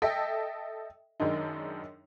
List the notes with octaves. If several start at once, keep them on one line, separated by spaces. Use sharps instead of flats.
A4 D#5 E5 G5
F#2 D#3 G#3 D4 D#4